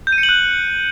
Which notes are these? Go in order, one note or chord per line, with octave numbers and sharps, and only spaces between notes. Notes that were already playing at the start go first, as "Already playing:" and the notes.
G6
D#7
C#7
F#7
F#6